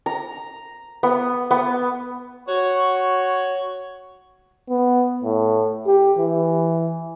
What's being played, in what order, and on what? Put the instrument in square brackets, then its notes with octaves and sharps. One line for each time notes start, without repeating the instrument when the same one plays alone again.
[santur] A#5
B3
B3
[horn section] F#4 C#5
[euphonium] B3
A2
G4
E3